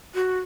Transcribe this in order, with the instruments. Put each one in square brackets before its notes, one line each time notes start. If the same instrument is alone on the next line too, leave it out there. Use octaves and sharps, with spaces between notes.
[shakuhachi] F#4